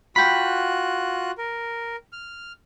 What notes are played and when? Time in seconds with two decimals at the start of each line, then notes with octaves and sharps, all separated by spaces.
0.16 F4 F#4 G5 B5 F#6
1.38 A#4
2.13 F6